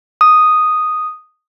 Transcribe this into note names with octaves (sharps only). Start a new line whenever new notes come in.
D#6